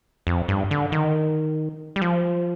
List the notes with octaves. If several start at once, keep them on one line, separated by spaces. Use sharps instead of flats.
F2
G2
D3
D#3
G3
F3